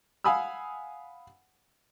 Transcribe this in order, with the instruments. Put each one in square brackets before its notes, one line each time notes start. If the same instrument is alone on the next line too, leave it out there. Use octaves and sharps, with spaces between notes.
[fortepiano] F5 F#5 G#5 B5 D#6 E6